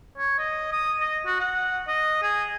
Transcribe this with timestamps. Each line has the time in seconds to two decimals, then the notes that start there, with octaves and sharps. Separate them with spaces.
0.18 C#5
0.39 D#5
0.72 D#6
1.00 D#5
1.26 F#4
1.40 F#5
1.87 D#5
2.22 G#4